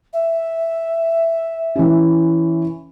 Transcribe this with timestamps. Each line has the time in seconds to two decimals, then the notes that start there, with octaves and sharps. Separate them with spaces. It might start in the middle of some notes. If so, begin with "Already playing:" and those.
0.13 E5
1.76 E3 C#4